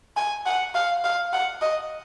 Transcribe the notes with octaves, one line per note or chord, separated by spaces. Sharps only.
G#5
F#5
F5
F5
F#5
D#5